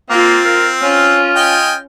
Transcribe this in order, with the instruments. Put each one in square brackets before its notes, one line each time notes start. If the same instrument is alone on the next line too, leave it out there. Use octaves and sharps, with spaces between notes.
[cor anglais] A#3 [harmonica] C4 [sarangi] F4
[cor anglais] A#4
[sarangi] C#4 [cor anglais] F4
[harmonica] D#5 G5 G#5